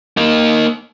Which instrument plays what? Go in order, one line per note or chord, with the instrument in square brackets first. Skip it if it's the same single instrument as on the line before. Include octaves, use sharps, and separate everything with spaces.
[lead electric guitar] A#3 D#4